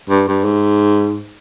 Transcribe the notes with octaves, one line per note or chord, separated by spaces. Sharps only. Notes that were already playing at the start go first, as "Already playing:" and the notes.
G2
G2
G#2